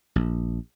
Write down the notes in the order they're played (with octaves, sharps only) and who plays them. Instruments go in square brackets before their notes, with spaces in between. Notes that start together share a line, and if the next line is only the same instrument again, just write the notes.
[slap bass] A#1